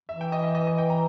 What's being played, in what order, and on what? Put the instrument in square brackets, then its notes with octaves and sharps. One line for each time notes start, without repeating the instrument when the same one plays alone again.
[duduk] E3 [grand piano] E5
[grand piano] G5
D#5
E5
D#5
D#5
G5
A#5